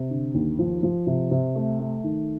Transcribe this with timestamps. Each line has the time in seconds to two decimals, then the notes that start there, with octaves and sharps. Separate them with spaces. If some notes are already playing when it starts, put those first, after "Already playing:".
Already playing: C3
0.10 D3
0.34 D#2
0.59 F3
0.83 F3
1.07 C3
1.31 C3
1.55 A3
1.79 A3
2.04 D#3